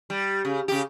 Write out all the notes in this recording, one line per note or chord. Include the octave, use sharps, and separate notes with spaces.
G3
C#3
C#3 G4